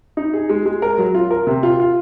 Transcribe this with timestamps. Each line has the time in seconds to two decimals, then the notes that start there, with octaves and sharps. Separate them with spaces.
0.17 D#4
0.33 G#4
0.49 G#3
0.66 G#3
0.82 A#4
0.98 F#3
1.15 F4
1.31 A#4
1.47 C3
1.63 F4
1.80 F4